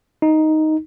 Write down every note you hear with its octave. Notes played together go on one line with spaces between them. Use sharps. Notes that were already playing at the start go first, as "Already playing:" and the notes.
D#4